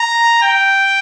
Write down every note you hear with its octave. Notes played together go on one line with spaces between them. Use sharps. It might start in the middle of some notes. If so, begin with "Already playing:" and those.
Already playing: A#5
G5